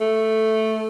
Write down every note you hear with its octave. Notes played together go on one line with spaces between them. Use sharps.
A3